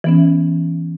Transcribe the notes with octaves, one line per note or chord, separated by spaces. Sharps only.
E3 B3 C#4